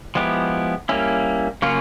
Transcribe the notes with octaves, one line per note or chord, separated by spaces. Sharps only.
F3 G#3 B3 E4 G4
G3 A#3 C#4 E4
C#3 F#3 A#3 C#4 F4